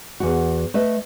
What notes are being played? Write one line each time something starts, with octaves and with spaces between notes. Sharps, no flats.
E2 F#4
A3 B4 D#5